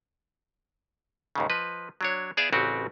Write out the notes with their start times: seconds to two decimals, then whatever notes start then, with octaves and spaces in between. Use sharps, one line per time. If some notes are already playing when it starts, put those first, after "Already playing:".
1.35 D#2 G#2 C#3
1.50 F3 B4 D#5
2.01 F#3 D4 C#5
2.37 B3 G#4 D5 E5 F5
2.52 A1 C#3 C4 F#4 G4 F#5